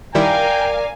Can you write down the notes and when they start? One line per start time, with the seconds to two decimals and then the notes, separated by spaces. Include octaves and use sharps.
0.15 D#3 G3 E4 A#4 D5 F5 G5 G#5